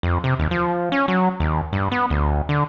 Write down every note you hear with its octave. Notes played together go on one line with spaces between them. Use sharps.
F2
C3
D#2
F3
C#4
F#3
D#2
G2
B3
D2
D3